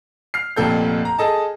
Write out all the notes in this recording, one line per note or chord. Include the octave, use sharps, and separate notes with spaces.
F6 C7
F1 F2 A#2 A4 G6
A#5
G#4 A4 D#5 A5